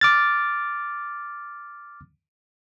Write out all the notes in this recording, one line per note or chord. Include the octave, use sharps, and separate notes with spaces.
D6 F6 A6